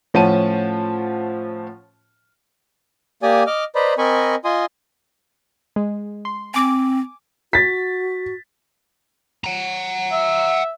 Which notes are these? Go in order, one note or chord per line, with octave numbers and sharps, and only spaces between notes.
A2 F3 C#4 F#5 A5 D#7
A#3 G4 D5 G#5 D#6
D#5 D6 F6
B4 C5 D5 D#5 A#5 B5
C4 A#4 D#5 G#5 B5 C#6
F4 D#5 G#5 C6 D#6
G#3
C6
C4 G#5 D6
F#4 A6 B6
F#5 A#5
E5